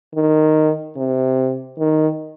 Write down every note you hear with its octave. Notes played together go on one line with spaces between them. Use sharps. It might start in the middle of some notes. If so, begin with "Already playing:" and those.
D#3
C3
D#3